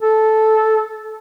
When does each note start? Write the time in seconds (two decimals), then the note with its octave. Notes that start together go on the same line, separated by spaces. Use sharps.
0.02 A4